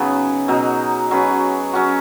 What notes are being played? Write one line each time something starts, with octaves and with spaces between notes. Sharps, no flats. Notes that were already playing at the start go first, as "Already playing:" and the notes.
Already playing: C#3 F#3 B3 D#4 G#4
B2 F#3 D#4
F#3 C#4 B4
F#3 C#4 F#4